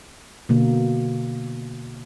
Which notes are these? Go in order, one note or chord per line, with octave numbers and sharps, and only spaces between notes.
B2 D3 A#3